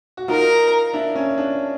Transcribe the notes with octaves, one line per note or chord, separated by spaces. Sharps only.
F#4
D#4 F4 A#4
D4 E4
C#4
D4